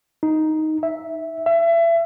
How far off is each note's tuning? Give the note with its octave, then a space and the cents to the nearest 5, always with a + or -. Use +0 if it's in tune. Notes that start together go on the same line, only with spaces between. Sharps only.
D#4 +5
E5 -5
E5 +30